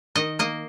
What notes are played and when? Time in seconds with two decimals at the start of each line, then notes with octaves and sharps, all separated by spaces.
0.16 D#3 D#5
0.39 A#3 D#5